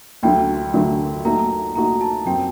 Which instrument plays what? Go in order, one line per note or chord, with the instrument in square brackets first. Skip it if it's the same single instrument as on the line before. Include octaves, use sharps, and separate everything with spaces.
[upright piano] D2 D3 F#3 A3 [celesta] G5
[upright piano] D2 D3 F#3 A3
[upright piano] A#2 A3 D#4 F#4 [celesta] A#5
[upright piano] A#2 A3 D#4 F#4 [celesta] A#5
[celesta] A5
[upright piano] F#2 F#3 C4 [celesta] G5